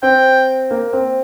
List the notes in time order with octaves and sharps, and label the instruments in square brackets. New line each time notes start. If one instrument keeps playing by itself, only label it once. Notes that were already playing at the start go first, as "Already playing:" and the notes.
[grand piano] C4 [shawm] G5
[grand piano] A#3
C4